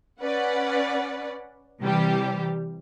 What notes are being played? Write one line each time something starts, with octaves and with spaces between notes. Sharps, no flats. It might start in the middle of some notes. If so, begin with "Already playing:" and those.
C#4 B4 D5 F#5
C3 E3 G3 G4